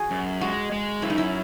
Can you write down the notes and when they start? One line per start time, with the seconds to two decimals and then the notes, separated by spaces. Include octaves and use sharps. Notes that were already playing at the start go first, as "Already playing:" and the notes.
Already playing: F#4 G#4
0.11 F#2
0.41 G#3 F#4
0.72 G#3
1.02 F#2 E4
1.10 D#4
1.18 E4